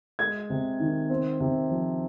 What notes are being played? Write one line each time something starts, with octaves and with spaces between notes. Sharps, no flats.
G#3 G#6
C3
D#3
C4
C3
F3